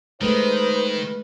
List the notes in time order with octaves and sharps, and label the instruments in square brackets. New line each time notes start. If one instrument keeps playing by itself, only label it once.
[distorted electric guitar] D#3 [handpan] G#3 A3 [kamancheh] B4 [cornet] C5